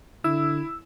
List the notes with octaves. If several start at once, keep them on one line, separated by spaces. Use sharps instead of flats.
D3 E4 E6